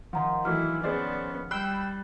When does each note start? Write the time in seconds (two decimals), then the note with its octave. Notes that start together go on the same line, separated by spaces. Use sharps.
0.13 D#3 F3 F#5 A#5 C6
0.45 E3 F#3 A3 E4 F6
0.84 B3 C#4 G#4 C5 D5
1.51 G3 G5 B5 E6 F#6 C7